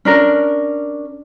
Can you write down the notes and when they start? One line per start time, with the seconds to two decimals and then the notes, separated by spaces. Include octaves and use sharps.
0.05 C#4 D4 A#4